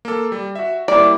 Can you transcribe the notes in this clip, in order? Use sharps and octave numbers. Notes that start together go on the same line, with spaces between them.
A#3 A4
G3
F#4 E5
G3 A#3 E4 D5